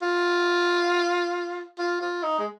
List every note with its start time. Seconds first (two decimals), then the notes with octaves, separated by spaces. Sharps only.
0.02 F4
1.79 F4
2.01 F4
2.24 D#4
2.39 G#3